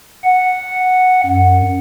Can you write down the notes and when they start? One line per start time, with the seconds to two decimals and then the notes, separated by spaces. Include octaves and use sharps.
0.24 F#5
1.26 F#2